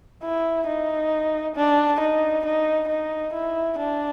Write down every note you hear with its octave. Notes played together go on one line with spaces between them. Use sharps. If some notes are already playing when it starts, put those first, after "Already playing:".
E4
D#4
D4
D#4
D#4
D#4
E4
D4